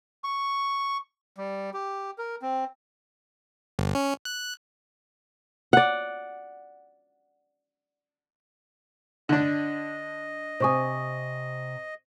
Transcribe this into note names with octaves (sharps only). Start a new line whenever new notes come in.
C#6
G3
G4
A#4
C4
G1
C#4
F#6
D5 F#5
D3 D4 D#5
C3 C5 G#5 C#6 D#6